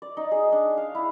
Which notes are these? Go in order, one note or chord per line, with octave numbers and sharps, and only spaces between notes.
D5
D#4
G#4
D4
F5
E4